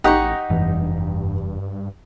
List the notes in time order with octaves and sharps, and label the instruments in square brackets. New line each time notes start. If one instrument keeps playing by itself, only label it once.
[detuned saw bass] A1 [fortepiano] D#4 G4 [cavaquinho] F#5 A#5 C#6
[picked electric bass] F1 E3 [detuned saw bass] G2